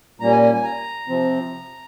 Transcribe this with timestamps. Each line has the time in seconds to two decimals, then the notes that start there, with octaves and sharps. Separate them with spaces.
0.20 A#2 G3 A#3 C#4 A#5
0.31 G#5
0.42 G#5
0.54 G#5
0.64 A#5
1.08 C3 F3 C4